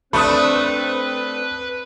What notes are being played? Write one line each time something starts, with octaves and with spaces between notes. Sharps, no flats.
A3 C4 D4 B4 B5 D#6